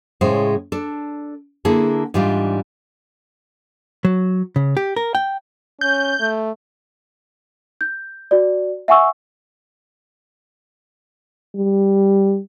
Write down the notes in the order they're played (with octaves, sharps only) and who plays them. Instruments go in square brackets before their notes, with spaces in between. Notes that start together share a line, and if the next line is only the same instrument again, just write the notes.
[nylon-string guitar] A2 C#3 G#3 C5
D4 A4
D3 A#3 E4 G#4 A4
G#2 E3 G3 D4 F4
[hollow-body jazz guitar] F#3
C#3
G4
A#4
G5
[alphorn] C#4 [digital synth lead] G6
[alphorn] A3
[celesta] G6
F#4 D5
E5 F#5 G#5 C#6 E6
[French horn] G3